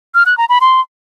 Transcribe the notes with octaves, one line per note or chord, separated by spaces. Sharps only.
F6
F#6
A#5
B5
C6